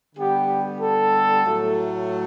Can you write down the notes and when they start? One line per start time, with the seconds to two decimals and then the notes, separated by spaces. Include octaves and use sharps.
0.15 D3 G3 B3 G4
0.79 A4
1.44 A2 F#3 A3